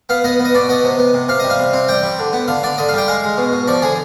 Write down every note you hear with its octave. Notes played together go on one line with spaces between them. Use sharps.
B3 F5
B3 D#5
B3
D#5
B2 D5
B3 D#5
C3
B3
C3
C3 F5
G3 D#5
F5
C3
C4
G3 G5
G3
D3
B3
D3 F5
D3 D5
D3 D#5
F5
G3 G5
G#3 F5
G#3
B2
B2
F3 D5
D3 G#4